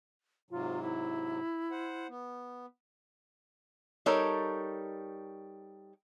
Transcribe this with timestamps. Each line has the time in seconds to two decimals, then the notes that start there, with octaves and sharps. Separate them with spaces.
0.51 G#2 C3 F#3 F4
0.82 E4
1.71 C5 F#5
2.09 B3
4.06 G3 D#4 A4 A#4 C#5